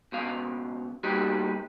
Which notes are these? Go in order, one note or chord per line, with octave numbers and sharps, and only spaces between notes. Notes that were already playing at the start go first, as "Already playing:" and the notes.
C#2 B2 F5
G3 A#3 B3 D#4 F#4 G4